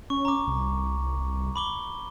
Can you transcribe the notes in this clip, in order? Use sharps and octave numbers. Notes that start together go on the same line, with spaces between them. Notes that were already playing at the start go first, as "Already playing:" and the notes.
C#4 C#6
A#5 D6
C2
B5 D6 G7